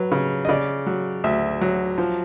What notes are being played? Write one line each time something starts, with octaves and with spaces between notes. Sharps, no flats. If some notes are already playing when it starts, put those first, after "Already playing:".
Already playing: F#3 B4
C#3
D#5
C#3 D5
F#3
D2 E5
F#3
F3